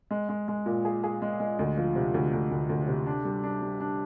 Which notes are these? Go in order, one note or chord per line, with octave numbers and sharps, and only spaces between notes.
G#3
G#3
G#3
A#2
G#4
G#4
G#3
G#3
D2
F3
C3
D2
D2
D2
D2
C3
D4
G3
D4
G3
D4